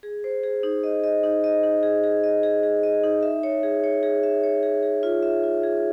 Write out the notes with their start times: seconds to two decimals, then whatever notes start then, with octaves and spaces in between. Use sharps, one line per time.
0.03 G#4
0.24 C5
0.44 G#4
0.63 D#4
0.84 D#5
1.04 D#5
1.23 D#4
1.44 D#5
1.63 D#4
1.83 G#4
2.04 G#4
2.24 D#5
2.43 G#4
2.63 G#4
2.83 D#5
3.04 D#4
3.23 E5
3.43 C#5
3.63 G#4
3.84 C#5
4.03 G#4
4.23 E5
4.43 C#5
4.63 G#4
4.83 G#4
5.03 F4
5.23 E5
5.43 F4
5.64 G#4